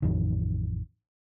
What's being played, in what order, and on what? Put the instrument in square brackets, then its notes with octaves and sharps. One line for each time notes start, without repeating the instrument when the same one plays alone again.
[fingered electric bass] A1 F2 D#3